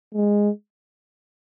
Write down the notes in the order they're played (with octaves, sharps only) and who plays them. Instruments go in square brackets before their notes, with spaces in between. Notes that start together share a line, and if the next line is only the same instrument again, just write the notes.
[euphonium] G#3